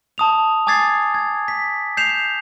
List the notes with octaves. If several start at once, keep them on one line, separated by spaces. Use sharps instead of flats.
A5 D#6 F7
G#5 D6 D#6 G#6 A6 C7
G#6
B6
G6 C7 E7 F7